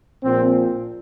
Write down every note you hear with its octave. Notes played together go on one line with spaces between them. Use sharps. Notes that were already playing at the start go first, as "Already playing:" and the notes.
A#1 A#2 F3 C4